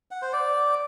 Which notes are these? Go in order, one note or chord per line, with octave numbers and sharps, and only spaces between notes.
F#5
C5
D5